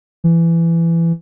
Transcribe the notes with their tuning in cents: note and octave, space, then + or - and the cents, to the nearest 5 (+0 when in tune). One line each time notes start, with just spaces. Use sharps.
E3 +20